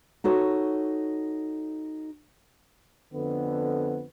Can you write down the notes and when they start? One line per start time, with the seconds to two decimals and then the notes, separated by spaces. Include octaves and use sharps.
0.24 D#4 F#4 A4 C#5
3.13 F2 D3 B3